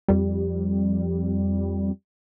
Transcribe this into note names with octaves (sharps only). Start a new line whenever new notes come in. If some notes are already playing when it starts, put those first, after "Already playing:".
F2 G3